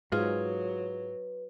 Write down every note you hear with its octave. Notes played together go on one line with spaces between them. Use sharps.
G#2 F#3 F4 G#4 B4